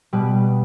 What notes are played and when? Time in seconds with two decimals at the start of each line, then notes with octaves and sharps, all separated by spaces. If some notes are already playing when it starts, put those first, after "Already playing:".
0.13 B2 G3 B4